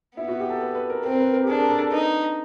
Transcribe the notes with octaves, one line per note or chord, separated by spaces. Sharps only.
B3 E4
F#4
G4
A4
B4
B4
A#4
C4 A#4
A#4
B4
A#4
G4
D4 G#4
A#4
A4
A4
D#4 B4